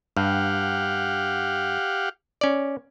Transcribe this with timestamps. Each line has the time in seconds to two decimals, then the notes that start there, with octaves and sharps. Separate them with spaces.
0.17 G2 G4 F5 F#5
2.41 C#4 D5